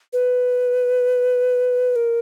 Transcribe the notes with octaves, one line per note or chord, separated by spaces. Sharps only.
B4
A#4